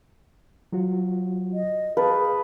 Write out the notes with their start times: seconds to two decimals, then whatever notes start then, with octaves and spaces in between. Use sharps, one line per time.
0.72 F#3 F4 F#4
1.53 D#5
1.97 G#4 B4 F5 A5